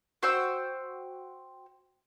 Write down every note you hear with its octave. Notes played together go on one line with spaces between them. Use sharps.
F#4 C5 G5 E6